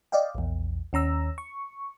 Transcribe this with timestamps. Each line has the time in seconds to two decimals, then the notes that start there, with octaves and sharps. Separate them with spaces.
0.12 D5 D#5 F5 G5
0.35 A#1 E2
0.93 D#2 C#4 A#5 E6
1.38 C#6